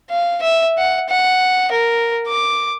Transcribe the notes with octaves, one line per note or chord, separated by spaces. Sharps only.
F5
E5
F#5
F#5
A#4
D6